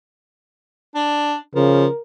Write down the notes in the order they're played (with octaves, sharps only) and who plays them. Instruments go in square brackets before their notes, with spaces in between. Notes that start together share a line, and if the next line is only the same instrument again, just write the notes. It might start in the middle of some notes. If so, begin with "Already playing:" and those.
[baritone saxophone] D4
[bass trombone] C#3 [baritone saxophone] F3 [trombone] A#4